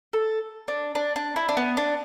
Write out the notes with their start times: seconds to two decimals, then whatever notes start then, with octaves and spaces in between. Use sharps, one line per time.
0.13 A4
0.68 D4
0.95 D4
1.16 D4
1.36 E4
1.49 D4
1.57 B3
1.77 D4